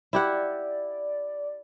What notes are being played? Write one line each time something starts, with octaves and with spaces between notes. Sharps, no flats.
E4 G4 D5 F#5